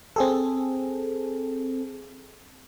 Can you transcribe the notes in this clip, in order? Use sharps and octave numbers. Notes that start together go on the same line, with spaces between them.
C4 G#4 A4